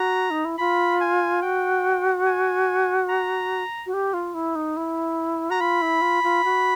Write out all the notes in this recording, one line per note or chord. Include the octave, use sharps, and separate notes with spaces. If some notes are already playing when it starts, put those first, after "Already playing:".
Already playing: F#4 A#5
D#4
E4
F4 B5
G#5
F#4 G5
G#5
A#5
F#4
G4
F4
E4
D#4
E4
F#4 A#5
F4 B5
E4
F4
F4
F#4